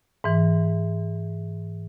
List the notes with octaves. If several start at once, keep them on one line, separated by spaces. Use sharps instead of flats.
G#2 E3